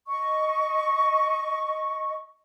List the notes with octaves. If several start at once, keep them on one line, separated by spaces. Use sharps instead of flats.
D#5 C#6